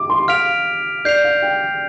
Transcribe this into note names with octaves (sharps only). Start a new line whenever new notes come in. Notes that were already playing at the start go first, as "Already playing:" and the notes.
Already playing: D6
C6
F5 F6 B6 D7 F7
D5 G6 C7 F7
F5
G5